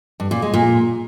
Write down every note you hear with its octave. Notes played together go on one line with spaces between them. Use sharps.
G2
A#2
G#3
A#2